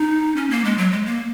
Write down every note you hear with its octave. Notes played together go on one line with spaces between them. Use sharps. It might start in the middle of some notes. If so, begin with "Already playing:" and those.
Already playing: D#4
C#4
A#3
G#3
F#3
G#3
A#3